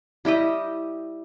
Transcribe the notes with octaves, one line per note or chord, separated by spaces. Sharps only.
G3 E4 G4 D#5